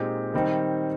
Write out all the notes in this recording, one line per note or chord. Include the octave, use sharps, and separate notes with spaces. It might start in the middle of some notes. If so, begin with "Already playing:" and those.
Already playing: A#2 G#3 C4 D#4 G4
D#3 G3 C4 D#4